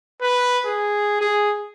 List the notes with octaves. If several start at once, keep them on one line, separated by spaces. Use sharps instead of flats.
B4
G#4
G#4